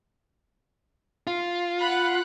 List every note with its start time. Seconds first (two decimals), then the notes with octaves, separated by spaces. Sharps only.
1.27 F4
1.80 F#5 B5 F#6